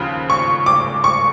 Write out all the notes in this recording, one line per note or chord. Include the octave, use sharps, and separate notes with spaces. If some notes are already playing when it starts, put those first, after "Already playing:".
Already playing: D#2 C#3 F3
C#6
D6
C#6